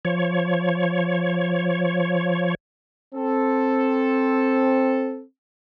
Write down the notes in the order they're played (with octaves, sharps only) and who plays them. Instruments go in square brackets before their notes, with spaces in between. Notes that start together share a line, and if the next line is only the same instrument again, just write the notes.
[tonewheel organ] F3 C#5
[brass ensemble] C4 A4